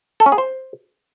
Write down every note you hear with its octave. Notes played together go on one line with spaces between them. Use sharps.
A4
C#4
G#4
C5